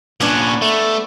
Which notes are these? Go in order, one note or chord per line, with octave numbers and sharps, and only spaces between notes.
A#2 B3 C#4 D4 C#5
A3